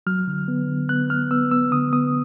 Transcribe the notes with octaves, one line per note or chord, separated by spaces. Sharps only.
F#3 F6
D3
B3
D3
B3 F#6
B3 F6
B3 E6
B3 E6
D3 D#6
B3 D#6